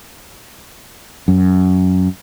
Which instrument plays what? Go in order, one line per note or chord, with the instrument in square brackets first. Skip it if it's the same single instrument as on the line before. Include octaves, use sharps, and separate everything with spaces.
[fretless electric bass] F#2